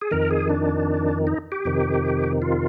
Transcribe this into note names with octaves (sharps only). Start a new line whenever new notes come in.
G#4
F2 D#3 A#4
G#4
D4
D#4
G4
F2 C3 D#3
F4